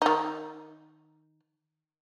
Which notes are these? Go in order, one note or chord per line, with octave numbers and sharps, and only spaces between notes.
D#3 D#4